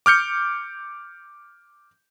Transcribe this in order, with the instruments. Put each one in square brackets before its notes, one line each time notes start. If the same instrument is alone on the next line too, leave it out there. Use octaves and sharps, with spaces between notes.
[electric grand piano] D6 F6 G6 C#7